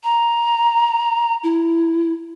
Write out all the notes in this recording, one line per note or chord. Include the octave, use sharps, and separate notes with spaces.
A#5
E4